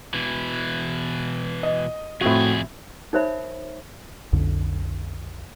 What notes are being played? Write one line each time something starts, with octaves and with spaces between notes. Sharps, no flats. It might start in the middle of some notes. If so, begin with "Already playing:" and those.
B2 E3
D#5
F2 A2 C4 F#4 G#4
D#4 A#4 C5 C#5 E5 B5
B1 F2 D3